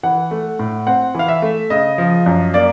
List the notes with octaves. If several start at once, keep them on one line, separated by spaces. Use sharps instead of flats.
E3 F#5
A3
A2
C4 F#5
E3 F5
E5
A3
C#3 D#5
F3
F#2
A#3 D5